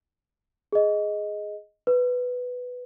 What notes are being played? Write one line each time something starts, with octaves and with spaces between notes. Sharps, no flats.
G#4 D#5
B4